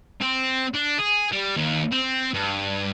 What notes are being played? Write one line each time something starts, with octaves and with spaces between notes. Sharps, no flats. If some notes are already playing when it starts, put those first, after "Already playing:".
C4
D4
G#4
G3
D#2
C4
G2